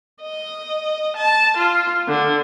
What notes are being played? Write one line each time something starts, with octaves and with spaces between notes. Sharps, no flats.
D#5
A5
F4
D3